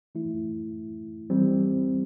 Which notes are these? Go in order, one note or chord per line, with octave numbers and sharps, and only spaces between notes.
E3 A3 E4
E3 G3 C4